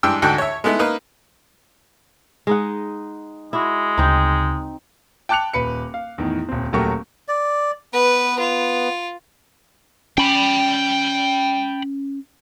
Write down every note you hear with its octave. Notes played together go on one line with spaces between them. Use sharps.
G2 E3 G#3 G5 E6
D2 G#2 F#4 A4 G5 F#6
C#5 E5
G#3 A3 B3 D#4 E4
A#3 D#4 B4
G#3 D#4 F#5
G#3 E4 F#4
D2 C#3 C4 D#4 G6
G5 A5 D6 F#6 C#7 F7
D#1 B4 C#7
F5
E2 A2 D#3
D#1 C4
D#1 F#3 A3 G4 A#4 C#6
D5
B3 B4
F4
C#4 G5 B5